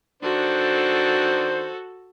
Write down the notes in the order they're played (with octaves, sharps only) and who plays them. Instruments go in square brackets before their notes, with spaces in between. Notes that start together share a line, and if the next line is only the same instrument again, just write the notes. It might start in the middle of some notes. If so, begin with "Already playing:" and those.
[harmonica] D#3 D4 C5 [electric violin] F#4 A4